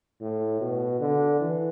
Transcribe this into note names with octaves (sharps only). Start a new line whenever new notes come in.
A2
B2
D3
E3